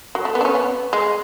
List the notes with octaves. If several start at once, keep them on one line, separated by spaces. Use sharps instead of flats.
F#3
A3
B3
D4
C#4
B3
G#3